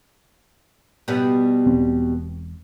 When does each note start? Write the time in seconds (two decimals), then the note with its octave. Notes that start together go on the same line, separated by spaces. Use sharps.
1.08 B2 G3 B3
1.66 E1 C4